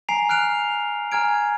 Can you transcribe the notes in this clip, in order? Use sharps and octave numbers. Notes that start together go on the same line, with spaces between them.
G#5 A#5 C7 D7 F7
F6 F#6 D7 F7
G#5 A#5 F6 G#6 D7